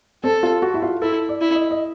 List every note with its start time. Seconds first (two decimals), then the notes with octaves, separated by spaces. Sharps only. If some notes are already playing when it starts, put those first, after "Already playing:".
0.24 C4 A4
0.43 F4
0.62 F#4
0.74 E4
0.82 F4
1.02 E4 A4
1.29 D5
1.41 E4
1.55 D#5
1.71 D#5